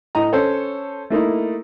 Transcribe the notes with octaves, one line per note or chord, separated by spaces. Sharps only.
A2 D#5 A#5
C#4 A4 C5 C#5
A3 A#3 D#4 E4